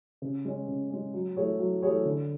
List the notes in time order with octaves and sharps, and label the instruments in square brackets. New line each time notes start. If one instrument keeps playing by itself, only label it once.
[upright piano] C#3
G#3 C#4
C#3
G#3 C#4
F#3
A3 E4 G#4 C#5
F#3
A3 E4 G#4 C#5
D3